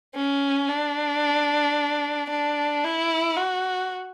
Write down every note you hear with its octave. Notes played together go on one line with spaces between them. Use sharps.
C#4
D4
D4
E4
F#4